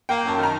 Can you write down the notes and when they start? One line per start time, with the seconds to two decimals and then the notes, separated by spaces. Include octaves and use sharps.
0.09 A#3 G5
0.23 F#2 A5
0.38 D#3 A#5